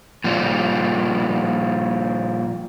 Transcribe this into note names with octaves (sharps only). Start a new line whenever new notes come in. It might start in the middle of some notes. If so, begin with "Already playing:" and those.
A#2 F3 G3